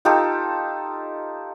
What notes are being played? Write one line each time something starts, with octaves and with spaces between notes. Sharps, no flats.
D#4 F4 G4 A4